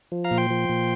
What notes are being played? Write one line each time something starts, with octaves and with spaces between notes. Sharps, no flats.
F3
F5 A#5
A#2
G5 C6
F3
A#2